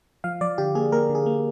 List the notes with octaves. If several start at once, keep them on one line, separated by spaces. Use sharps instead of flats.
F3 F5
F3 D5
D3 G4
A#3 G#4
A#3 A#4
D3
G#4
A#3